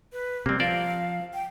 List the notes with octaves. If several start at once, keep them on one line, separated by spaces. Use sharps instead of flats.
B4
C3 G3 A#3 C4
F3 A#4 C5 D5 F5
G5